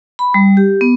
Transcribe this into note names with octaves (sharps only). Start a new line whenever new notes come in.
B5
G3
G4
B3